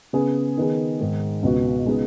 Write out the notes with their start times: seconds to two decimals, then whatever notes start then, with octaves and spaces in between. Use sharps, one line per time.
0.13 C#3 B3 G#4
0.57 D#3 B3 G#4
1.00 G#2 D#3 G#3
1.43 C#2 B2 B3 F#4
1.86 C#3 G#3 B3 D#4 G#4